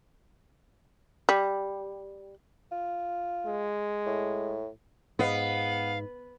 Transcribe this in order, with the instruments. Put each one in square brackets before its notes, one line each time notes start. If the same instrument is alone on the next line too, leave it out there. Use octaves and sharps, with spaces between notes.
[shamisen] G3
[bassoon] F4
[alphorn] G#3
[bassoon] A2
[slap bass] G#2 [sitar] B3 [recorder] F5